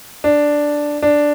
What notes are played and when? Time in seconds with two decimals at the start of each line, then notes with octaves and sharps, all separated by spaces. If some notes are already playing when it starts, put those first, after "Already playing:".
0.24 D4
1.03 D4